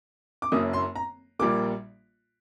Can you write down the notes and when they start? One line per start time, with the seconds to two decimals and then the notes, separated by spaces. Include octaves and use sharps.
0.42 D6
0.52 F#1 F#2 F#3 A#3 D#6
0.73 C6
0.96 A#5
1.39 A#1 A#2 G3 A#3 D6